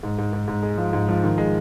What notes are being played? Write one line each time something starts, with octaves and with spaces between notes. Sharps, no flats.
G#2
G#2
G#2
G#2
G#3
F3
G#2
F3
D#3
G#3